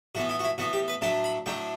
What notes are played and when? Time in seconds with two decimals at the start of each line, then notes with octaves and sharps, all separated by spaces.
0.15 A2 E3 B3 F#4
0.29 E4
0.39 F#4
0.44 E4
0.58 A2 E3 B3 F#4
0.73 G4
0.88 B4
1.01 A2 F#3 A3 D4 A5
1.24 B5
1.46 A2 F#3 A3 D4 G5